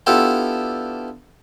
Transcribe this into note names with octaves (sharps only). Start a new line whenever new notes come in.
B3 D4 E4 F4 G4 A4